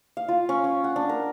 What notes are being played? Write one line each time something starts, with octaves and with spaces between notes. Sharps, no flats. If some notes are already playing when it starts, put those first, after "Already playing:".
F5
F4
C#4
C#4
F#5
D4
A#4